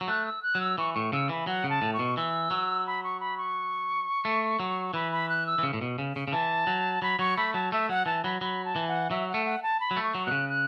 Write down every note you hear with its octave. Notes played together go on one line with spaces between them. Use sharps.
F#3
A3 F#6
E6
F#6
F#3
E6
E3 C#6
A2 C#6
C#3 E6
E3 B5
F#3 F#5
C#3
A5
A2
C#6
B2
E3 E6
F#3
B5
C#6
B5
C#6
A3
F#3
E3 B5
B5
F#6
E6
E3
C#3
A2
B2
C#3
C#3
C#3
E3 A5
F#3
F#3 B5
F#3 C#6
A3 B5
F#3 A5
A3 E5
F#3 F#5
E3 A5
F#3 B5
F#3 B5
A5
E3
F#5
F#3 E5
F#5
A3
F#5
A5
B5
F#3
A3
C#6
F#3
B2 F#6
C#3
F#6